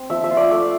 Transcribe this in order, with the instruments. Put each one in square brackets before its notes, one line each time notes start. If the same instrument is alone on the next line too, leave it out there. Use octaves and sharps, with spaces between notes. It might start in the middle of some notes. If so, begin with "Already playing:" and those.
Already playing: [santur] C4
F3 E5
E5
F4
D5
A3 E5